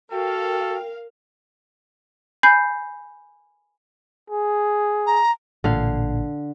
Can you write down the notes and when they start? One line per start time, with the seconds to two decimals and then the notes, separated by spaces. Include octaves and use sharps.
0.11 F#4 A4 A#4 F5 G5
2.43 G#5 B5 G6 C7
4.30 G#4
5.07 A#5
5.64 A1 A#2 D3 F5